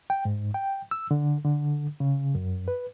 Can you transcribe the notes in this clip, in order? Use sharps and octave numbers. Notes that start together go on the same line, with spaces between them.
G5
G#2
G5
E6
D3
D3
C#3
F#2
B4